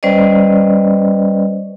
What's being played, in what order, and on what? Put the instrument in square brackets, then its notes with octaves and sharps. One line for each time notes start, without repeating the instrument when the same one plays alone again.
[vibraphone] G3 C#4 B4 C5 D5 D#5